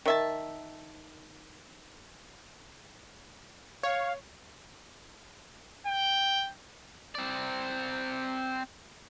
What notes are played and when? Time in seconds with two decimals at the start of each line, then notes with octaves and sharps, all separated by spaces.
0.06 D#3 E5 A5
3.83 C#5 F5
5.87 G5
7.15 C4 D5